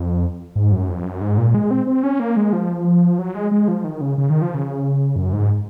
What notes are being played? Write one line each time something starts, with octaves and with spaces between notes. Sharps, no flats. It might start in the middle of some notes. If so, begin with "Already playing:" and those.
Already playing: F2
G#2
F#2
F2
F#2
G#2
A#2
G#3
C4
C4
C#4
A#3
G#3
F3
F#3
G#3
G#3
F3
D#3
C#3
C#3
D#3
F3
C#3
F#2
G#2